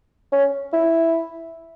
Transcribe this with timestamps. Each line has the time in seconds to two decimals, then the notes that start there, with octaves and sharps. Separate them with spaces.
0.32 C#4
0.73 E4